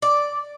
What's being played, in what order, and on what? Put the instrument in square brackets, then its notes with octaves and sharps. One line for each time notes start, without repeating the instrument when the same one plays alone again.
[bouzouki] D5